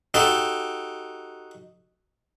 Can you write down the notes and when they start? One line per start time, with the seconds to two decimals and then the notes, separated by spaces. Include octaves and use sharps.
0.14 D#4 F#4 G4 A4